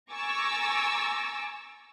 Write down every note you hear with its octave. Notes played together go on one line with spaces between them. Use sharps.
G#5 A#5 C#6 D6 E6 A6